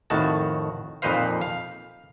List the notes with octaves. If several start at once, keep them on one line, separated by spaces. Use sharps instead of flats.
F2 A2 D#3 F#4 A5
F2 A#2 D#4 B4 C5 F5
F5